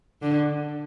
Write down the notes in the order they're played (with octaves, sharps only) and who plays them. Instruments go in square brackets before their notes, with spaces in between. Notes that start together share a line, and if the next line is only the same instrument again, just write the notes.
[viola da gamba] D3